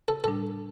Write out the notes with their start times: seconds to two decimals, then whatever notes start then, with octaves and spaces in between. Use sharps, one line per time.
0.08 A4
0.24 A2 G3 D4 A4